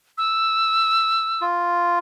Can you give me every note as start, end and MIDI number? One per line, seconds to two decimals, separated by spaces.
0.18 1.44 88
1.41 1.99 65